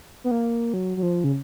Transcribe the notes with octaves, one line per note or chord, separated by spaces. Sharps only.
B3
A#3
F#3
F#3
F3
C#3